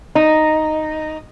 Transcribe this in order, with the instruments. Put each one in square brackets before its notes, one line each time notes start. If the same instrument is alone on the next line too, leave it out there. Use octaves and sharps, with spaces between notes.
[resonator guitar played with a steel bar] D#4